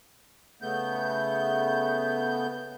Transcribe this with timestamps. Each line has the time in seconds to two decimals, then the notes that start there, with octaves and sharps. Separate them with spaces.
0.62 C#3 A3 B3 G6